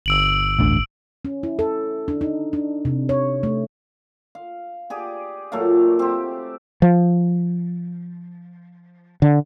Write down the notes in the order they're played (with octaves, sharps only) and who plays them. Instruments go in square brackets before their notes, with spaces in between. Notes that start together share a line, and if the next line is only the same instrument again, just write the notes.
[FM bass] G1 [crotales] E6 D7 F#7
[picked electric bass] A1 D2 D3
[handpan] C#4
E4
A4
D4
D#4
D4
C3
C#5
A3
[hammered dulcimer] F5
G4 G#4 D5
A#2 F#3 A3 F5
C4 G4
[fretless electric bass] F3
D3